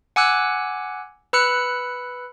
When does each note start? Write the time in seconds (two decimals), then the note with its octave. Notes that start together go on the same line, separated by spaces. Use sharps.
0.16 F#5 G#5 D6 E6 F#6
1.33 B4 B5 E6 F#6 C#7